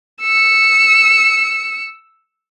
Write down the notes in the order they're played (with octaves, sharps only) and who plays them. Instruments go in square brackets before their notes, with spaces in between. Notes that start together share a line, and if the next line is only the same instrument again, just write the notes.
[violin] E6 C#7